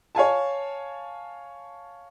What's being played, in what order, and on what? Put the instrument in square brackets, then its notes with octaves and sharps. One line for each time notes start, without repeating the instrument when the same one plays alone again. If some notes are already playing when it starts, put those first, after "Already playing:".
[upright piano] C#5 F5 G#5 A5